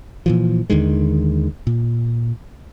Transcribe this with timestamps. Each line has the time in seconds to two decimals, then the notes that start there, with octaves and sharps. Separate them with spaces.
0.26 A#2 E3 F3
0.70 D#2 D3 D#3 G#3
1.67 A#2